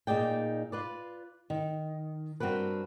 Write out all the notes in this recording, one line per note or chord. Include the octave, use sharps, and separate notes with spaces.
A#2 D#4 G#4 D5 G5
F4 B4 D5
D#3
G2 C4 F#4 A#4 B4